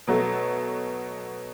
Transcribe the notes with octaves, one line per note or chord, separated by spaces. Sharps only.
B2 F#3 A3